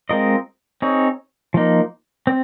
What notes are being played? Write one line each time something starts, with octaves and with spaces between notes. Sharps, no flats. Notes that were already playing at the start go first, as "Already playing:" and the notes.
G#3 C4 F4 A#4 D#5
C4 D#4 G#4 C#5
F3 A#3 D#4
C4